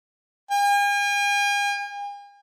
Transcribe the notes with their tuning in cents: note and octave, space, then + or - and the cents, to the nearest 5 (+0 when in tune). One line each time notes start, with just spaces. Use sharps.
G#5 -45